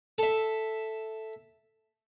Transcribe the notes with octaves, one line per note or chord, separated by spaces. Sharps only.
A4 E5